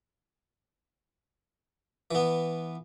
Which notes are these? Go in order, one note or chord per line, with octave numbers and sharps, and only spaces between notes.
E3 B3